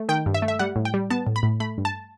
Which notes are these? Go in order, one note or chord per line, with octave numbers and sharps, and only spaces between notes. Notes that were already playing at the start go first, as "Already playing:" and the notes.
Already playing: A3
D#3 G5
G2
E5
A3
E5
G3 F#5
A2
G5
G3
B3 A5
A2
B5
A2
A3 B5
G2
A5